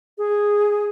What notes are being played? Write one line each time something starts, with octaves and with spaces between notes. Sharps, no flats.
G#4